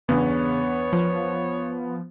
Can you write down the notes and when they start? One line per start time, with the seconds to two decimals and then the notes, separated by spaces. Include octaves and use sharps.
0.09 E2 G2 C#3 B3 C#5
0.93 F3